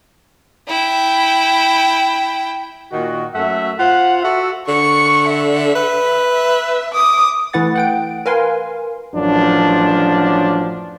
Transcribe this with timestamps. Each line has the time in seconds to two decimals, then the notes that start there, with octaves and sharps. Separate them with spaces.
0.67 E4 G5
2.92 A#2 D#3 F#4
3.35 F#2 A3 E5 F#5
3.78 F4 C5 F#5
4.21 F#4 A4 E5
4.68 D3 C#6 C#7
5.28 E5
5.75 B4
6.31 E5
6.94 D6 D#6
7.53 E3 A3 E4 B4 F#5 A6
7.76 F#5 G5 D7
8.26 A#4 B4 F5 G#5 C6
9.15 A1 F#2 F3 D4